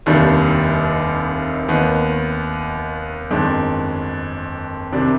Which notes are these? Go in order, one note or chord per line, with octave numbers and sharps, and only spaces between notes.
F1 D#2 D#3 G3 D4
D#2 D#3 B3
G1 F2 D#3 G#3 D4
C2 C3 D#3 G3 D4